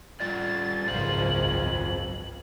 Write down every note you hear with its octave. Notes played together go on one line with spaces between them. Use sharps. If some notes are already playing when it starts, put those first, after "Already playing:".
G3 F4 D5 A6
G#1 C#2 F#2 F4 C5 F#7